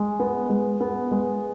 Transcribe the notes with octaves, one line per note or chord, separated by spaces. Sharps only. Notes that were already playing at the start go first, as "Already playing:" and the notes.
Already playing: G#3
B3
G#3
B3
G#3